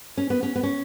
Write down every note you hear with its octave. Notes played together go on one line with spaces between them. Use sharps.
C#4
B3
C#4
B3
C#4